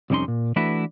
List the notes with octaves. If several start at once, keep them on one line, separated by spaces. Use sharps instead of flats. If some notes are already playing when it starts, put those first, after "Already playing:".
C2 F2 G3 C#4 D#4 C6
A#2
E3 A3 D4 E4 F#4 B4